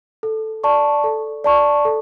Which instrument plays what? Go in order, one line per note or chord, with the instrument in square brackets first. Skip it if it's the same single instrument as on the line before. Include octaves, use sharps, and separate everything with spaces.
[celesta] A4
D5 A5 C#6
A4
D5 A5 C#6
A4